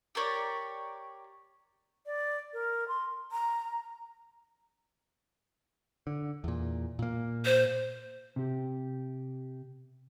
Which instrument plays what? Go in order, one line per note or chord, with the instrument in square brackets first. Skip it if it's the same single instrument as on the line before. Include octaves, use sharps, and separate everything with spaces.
[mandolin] G4 A#4 C#5 D5
[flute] D5
A#4
C6
[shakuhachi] A#5
[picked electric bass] D3
E2 A#2
A#2 A#3
[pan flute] C5
[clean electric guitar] C3 G4